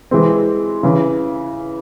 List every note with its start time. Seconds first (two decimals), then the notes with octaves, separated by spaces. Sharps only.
0.11 E3 G#3 C4
0.83 C#3 E3